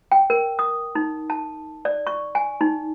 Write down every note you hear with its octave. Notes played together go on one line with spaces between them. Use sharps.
G5
A#4
D#6
D#4
A5
D5
C#6
G#5
D#4